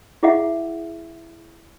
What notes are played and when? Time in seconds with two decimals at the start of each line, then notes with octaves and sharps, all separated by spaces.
0.23 E4 G#4 D#5 E5 F#5